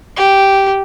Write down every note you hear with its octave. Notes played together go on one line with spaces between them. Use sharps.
G4